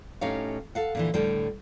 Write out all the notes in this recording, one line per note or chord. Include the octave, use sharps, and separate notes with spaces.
A2 C#4 D#4 G4 C#5 F5
A4 F5 F#5
A#2 D3 E3
A2 D3 G3 G5